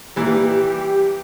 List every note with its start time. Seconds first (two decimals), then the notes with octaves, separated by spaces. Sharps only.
0.16 A#2 E3 G3 G4